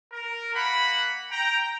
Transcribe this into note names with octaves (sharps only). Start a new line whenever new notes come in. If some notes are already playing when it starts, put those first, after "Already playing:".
A#4
A#3 F#5 B5
G5 A#5